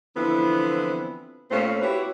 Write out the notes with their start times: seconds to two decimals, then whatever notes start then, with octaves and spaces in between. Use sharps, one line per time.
0.16 D3 E3 F3 B3 C4 E4
1.51 A#2 A3 C4 C#4 C5 F5
1.82 E4 F#4 G4 B4 C#5